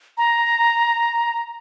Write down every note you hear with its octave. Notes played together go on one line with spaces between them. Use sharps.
A#5